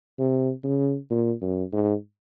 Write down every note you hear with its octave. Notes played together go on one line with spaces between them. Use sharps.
C3
C#3
A#2
F#2
G#2